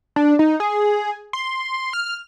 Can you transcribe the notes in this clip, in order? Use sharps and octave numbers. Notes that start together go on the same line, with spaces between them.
D4
D#4
G#4
C6
F6